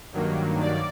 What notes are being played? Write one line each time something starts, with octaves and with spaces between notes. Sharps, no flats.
G2 D#3 F#3 A#3
D5